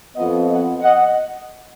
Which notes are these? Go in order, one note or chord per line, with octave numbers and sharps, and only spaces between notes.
F2 F3 B3 D#5 F#5
D#5 F#5
D#5 F#5